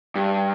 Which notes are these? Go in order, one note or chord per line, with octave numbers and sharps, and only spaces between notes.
G2